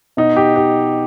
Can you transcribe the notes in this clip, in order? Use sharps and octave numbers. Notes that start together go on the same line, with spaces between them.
B2 D#4
G4
G4